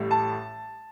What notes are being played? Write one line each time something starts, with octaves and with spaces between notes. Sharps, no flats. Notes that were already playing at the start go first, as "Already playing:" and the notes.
Already playing: A1 A2 G3
A5